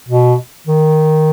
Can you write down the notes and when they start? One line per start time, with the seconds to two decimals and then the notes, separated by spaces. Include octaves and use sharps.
0.08 B2
0.67 D#3